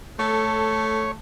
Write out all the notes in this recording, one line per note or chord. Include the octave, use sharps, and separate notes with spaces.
A3 A4 C#5